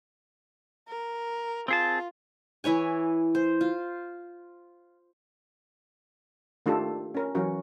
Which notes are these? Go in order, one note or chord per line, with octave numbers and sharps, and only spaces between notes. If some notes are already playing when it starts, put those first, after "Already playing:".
A#4
C4 F4 G#4 A5
E3 E4 C#5 G#5
C5
F4
D#3 A3 D4 F4 G4 A4
C#4 A#4
E3 F#3 C#4 F#4 A#4